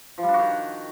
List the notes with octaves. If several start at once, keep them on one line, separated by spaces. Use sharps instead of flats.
F3
G3
D4
F#4
D#3